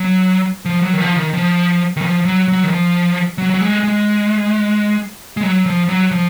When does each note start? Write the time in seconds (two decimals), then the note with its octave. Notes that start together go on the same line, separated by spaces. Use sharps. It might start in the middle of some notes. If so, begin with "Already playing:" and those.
Already playing: F#3
0.65 F3
0.82 F#3
0.93 D#3
1.00 F3
1.16 D#3
1.33 F3
1.97 D#3
2.02 F3
2.25 F#3
2.48 F#3
2.63 D#3
2.70 F3
3.38 F#3
3.50 F#3
3.61 G#3
3.84 G#3
5.37 G#3
5.43 F#3
5.66 F3
5.89 F#3
6.11 F3